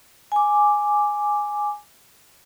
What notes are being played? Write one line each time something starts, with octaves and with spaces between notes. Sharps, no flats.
G#5 D6